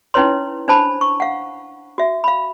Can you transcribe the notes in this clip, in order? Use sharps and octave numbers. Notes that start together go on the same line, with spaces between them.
C#4 D#4 E4 B4 C#5 C6
D4 C5 A5 B5
C#6
F5 F#5
F#4 E5
F5 B5